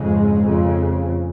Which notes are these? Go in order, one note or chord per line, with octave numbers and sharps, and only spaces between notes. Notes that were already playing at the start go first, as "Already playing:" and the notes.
Already playing: F2 G#2 C#3 G#3
F2 C#3